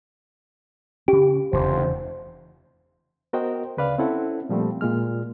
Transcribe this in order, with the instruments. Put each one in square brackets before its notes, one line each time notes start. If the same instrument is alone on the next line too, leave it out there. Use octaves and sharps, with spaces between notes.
[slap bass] C#3 C#4 [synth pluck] G4
[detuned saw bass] F1 [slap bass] E2 C#3 E3 [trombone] C5
[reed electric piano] B3 F#4 A#4 C5 D#5 G5
D2 C#3 B4 D5 F5
C4 C#4 E4 A4 F#5
A#2 F3 G3 A3 C4
A#2 G#3 F6